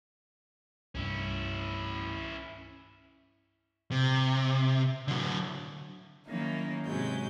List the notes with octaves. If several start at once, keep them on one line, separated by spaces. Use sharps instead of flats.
C2 G2 C#4 E4
C3
D3 F#3
D#3 F#3 A#3 C#4 D#4 E4
G#2 C3 F#3 G#3 G6